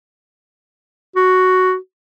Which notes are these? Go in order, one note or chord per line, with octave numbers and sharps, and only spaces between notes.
F#4